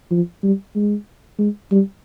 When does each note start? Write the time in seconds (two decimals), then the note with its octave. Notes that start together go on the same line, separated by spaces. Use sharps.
0.11 F3
0.43 G3
0.76 G#3
1.39 G#3
1.71 G3